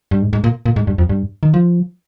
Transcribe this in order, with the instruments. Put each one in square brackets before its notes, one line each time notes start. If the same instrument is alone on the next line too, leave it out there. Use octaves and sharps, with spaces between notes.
[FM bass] G2
G#2
G#2
A#2
A#2
G#2
G2
F2
G2
D#3
F3